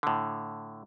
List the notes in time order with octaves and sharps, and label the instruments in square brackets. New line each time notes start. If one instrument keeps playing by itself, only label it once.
[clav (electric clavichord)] A2 D3